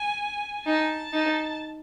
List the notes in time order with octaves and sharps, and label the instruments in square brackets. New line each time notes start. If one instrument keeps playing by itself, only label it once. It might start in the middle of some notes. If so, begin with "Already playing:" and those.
Already playing: [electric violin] G#5
[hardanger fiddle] D#4 [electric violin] A5
[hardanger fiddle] D#4